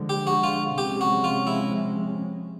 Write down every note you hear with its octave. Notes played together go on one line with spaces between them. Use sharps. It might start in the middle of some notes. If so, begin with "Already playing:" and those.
Already playing: D3 F3 G#3
G4
F#4
F4
C3 F3 G#3 C#4 G4
F#4
F4
E4